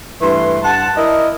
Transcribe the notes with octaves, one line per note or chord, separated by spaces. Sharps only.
G2 E3 A3 B4 C6
G2 F#5 A5
E4 A#4 D5 D#5